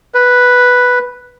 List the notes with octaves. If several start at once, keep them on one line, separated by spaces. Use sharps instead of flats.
B4